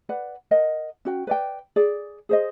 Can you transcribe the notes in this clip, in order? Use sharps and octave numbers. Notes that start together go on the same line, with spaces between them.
B4 D5 F#5
A#4 D#5 F#5
C#4 F#4 G5
B4 D5 G5
G#4 D5
G#4 C5 D#5